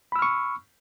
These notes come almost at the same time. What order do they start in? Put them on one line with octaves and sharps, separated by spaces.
B5 E6 F6 C#6